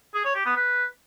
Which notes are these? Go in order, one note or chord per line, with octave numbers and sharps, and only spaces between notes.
G#4
C#5
G4
B3
B4